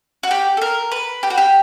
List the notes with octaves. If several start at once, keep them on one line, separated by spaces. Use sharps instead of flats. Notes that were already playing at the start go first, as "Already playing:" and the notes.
F#4
G4
A4
A#4
B4
G4
F#4
G4